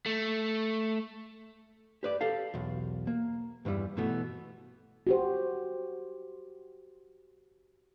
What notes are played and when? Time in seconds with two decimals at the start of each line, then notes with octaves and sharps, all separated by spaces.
0.06 A3
2.03 G4 B4 D5
2.21 G4 A4 F5
2.54 B1 E2
3.07 A#3
3.65 E2 G2 E3 G3
3.97 B2 E3 A3 B3
5.07 F#4 G4 C5